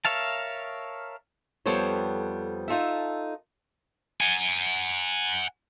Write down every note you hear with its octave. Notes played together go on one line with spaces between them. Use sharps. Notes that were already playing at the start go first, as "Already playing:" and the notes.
A#4 C#5 E5 F5 A5
F2 G3 B3 A4 C5 C#5
D#4 F4 A4 E5
F#5 G#5